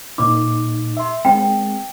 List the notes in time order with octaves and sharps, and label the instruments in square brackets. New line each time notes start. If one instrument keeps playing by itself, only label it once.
[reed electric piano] A#2 D#4 [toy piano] D6
[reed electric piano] E5 C6
[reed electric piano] G#3 C4 [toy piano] G5